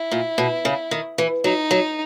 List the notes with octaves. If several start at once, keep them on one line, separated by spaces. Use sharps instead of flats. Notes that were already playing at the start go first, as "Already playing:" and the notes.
Already playing: E4
A#2
B2
C#3
D#3
E3
F#3 D#4
F#3